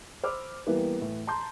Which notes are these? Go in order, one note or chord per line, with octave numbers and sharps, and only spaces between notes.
C5 B5 D6 E6 F6
E3 G3 A#3 B3 G4
A2 E3
A5 A#5 C6 G6